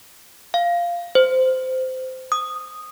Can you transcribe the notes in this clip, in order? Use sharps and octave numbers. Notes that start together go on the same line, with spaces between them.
F5
C5
D#6